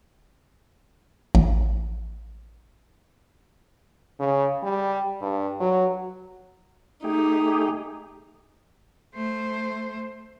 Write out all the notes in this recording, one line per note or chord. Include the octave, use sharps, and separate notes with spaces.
A1
C#3
G3
G2
F#3
A3 D#4 G4 G#4
A3 C5